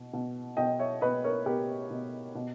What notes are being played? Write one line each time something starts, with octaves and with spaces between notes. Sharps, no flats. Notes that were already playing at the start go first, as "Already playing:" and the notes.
Already playing: B2
B2
B2 D#5 G5
C#5 E5
B2 B4 D#5
A#4 C#5
B2 G4 A#4
B2
B2